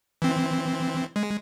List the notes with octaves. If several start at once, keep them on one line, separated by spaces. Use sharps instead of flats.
E3 C4
G#3